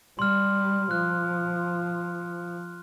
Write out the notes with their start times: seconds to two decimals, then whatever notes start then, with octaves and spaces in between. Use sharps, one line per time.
0.19 G3 C6 F6
0.91 F3 F#6